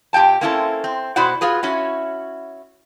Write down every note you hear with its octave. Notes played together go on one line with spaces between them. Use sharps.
A#2 G4 F#5 G5 A5
A#3 C4 C#4 E4 F4 A4
C4
B2 E4 F#4 C5 D5 F#5
F4 F#4 G#4 B4
C#4 E4 F#4